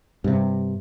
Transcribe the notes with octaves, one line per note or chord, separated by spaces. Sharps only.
G2 C3